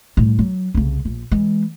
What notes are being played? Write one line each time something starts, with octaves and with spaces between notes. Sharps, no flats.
A2 G3
F#3
C2 C#3
A#1
E3 G#3